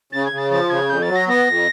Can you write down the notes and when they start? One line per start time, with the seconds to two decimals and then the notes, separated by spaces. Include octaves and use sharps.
0.12 C#3 A6
0.25 G#6
0.32 C#3
0.38 A6
0.51 F3 A6
0.70 C#3 G#6
0.89 F2 G6
1.02 A6
1.09 F#3
1.15 A#6
1.28 B3 A#6
1.47 F2